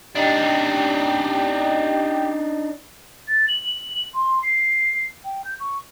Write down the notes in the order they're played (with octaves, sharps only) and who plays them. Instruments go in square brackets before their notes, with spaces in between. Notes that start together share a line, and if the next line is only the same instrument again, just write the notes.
[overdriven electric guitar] D4 D#4 [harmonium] G4
[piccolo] A6
F#7
C6
C7
G5
G6
C#6